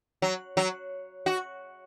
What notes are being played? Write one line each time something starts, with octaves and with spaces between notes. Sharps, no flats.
F#3
F#3
F#4